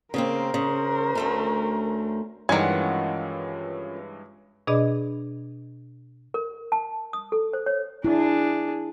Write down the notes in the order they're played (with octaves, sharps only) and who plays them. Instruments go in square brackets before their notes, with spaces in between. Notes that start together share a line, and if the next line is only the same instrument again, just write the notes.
[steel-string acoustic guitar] C#3 A#3 C4 [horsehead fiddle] A#4 C5
[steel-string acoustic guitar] C#3
D2 A3 C#4
[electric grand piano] G2 E3 G#3 [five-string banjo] D#3 G#5 [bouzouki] C#4 F4 F#5
[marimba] B2 D4 G#4 D5 D#5 B5
[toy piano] A#4
A5
D#6
A4
C5
C#5
[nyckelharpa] D4 G#4 [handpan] E4